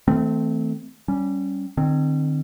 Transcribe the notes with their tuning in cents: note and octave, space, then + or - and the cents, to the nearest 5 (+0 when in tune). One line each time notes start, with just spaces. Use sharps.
E3 -45 A3 +5 C4 -15
G3 -15 C#4 +0
D#3 -45 C4 +0